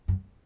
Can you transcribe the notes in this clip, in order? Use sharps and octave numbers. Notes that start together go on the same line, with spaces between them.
F#2